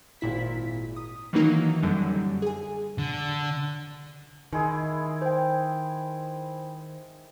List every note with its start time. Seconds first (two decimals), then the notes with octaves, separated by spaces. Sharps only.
0.21 G#1 A#2 E4 B6
0.96 D#6
1.33 D#3 E3 F#3 A#3 D#4
1.82 F#2 D3 F#3 G3
2.42 G#4 G#5
2.98 D3
4.53 D#3 G#3 E4 G#4
5.22 C5 G5